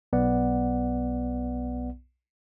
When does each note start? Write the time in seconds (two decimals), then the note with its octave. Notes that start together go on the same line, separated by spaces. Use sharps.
0.13 B1 B3 D5 F#5